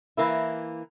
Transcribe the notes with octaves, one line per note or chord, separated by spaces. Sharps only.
E3 A#3 E4